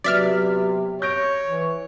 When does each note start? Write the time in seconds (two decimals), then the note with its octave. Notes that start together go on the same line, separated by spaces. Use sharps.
0.04 C3 F#3 B3 D5 E5 F6
1.02 C#5 G6 A#6 D7
1.46 E3